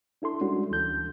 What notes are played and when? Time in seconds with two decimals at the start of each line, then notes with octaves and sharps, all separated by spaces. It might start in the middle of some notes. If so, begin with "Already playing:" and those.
0.22 D4 E4 A4 C6
0.40 G3 G#3 C#4 D4 F#4
0.71 D2 E3 A4 G6